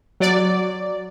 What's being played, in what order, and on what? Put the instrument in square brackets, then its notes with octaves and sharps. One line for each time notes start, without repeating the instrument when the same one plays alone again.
[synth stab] F#3 D5